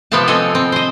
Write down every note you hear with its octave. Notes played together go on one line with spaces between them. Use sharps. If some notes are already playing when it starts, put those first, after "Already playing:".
C3 F3 B3 C4 F5 A5
C4 A4 D#5 G#5
C4
C5 D#5